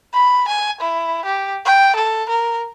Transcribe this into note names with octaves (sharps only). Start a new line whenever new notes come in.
B5
G#5
E4
G4
G5
A4
A#4